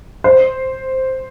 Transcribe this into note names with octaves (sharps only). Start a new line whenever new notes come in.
C5